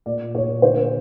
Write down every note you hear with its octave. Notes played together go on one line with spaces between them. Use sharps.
A#2 D5
A#2 C#5
D3 C5